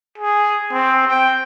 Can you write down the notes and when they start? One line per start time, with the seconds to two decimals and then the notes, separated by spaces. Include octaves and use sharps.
0.18 G#4
0.72 C4
1.07 G5